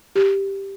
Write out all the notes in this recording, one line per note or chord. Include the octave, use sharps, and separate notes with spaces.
G4